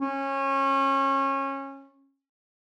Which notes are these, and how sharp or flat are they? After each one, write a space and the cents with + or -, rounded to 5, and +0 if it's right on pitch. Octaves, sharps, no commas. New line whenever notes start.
C#4 -25